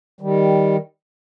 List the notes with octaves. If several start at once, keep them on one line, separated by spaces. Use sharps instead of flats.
D#3 G3